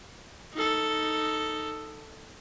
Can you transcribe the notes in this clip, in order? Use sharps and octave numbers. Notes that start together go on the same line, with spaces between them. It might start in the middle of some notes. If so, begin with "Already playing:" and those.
D#4 A4